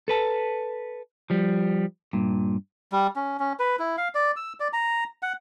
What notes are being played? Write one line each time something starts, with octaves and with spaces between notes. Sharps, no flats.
A4 B4 A5
F3 G3
G2 A#2
G3
C#4
C#4
B4
E4
F5
D5
E6
D5
A#5
F#5